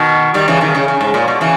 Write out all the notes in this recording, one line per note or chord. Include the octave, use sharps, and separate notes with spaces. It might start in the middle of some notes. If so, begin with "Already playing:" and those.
Already playing: B2 D#3
D#3 G3
C#3 E3
B2 D#3
C#3
C#3
G#2
A#2
B2
C#3 E3